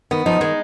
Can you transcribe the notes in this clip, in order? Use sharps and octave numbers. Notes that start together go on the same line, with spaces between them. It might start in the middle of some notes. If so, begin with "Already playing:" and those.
D#3 B3
F3 D#4
D#3 G#3